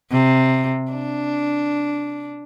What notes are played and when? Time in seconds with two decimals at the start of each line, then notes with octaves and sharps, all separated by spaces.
0.12 C3
0.92 D4